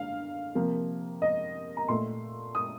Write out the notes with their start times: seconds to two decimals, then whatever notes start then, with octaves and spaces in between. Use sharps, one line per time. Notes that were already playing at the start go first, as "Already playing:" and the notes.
Already playing: D3 F5
0.55 C3 F3 A#3
1.22 D#5
1.77 A#5
1.88 A#2 A3 C6
2.55 D#6